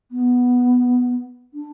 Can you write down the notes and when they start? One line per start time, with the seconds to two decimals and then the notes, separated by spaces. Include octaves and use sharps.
0.11 B3
1.54 D4